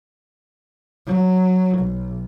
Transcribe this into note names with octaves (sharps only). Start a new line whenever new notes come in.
F#3
B1